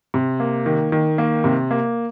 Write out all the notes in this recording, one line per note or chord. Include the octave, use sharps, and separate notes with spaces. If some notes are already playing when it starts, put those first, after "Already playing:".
C3
A#3
D#3
D#3
A#3
C3
A#3